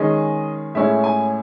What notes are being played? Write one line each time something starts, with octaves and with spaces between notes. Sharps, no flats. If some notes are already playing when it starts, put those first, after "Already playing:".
Already playing: D#3 G#3 C#4 D#5
A2 G#3 C#4 E4 E5
G#5